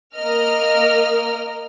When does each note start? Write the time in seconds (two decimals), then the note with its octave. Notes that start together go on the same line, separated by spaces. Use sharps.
0.15 A#3 A#4 D#5 F6